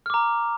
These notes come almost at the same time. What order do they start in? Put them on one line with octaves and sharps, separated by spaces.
F6 D6 A#5